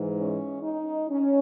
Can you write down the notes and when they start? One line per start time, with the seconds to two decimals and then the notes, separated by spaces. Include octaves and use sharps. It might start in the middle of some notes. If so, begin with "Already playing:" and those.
Already playing: G#2 E3 G#3
0.19 C#4
0.63 D#4
1.09 C#4